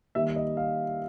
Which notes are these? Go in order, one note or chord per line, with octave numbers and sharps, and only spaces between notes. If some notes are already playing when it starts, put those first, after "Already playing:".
D#3 G3 A#3 E5
D#5
F5